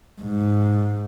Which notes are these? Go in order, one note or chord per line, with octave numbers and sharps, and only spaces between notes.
G#2